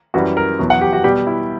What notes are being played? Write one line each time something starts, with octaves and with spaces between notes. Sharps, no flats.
F#2 E3 G3 F#4
A#4
E2 B2 F#3
F#5
G4
F#4
B2 G3 G4
E4